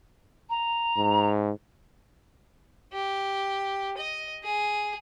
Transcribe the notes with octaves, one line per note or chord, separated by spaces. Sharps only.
A#5
G#2
G4
D#5
G#4